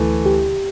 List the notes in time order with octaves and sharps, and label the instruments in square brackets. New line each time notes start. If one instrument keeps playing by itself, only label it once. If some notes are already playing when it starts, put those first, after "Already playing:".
Already playing: [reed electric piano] D2 [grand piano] E3 A3
[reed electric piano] G4